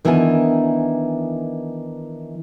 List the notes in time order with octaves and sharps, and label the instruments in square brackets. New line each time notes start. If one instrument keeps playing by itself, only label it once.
[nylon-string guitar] D#3 E3 B3 D4 D#4 G#5